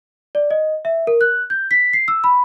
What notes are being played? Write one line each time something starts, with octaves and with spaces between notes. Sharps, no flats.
D5
D#5
E5
A#4
F#6
G6
B6
C7
E6
B5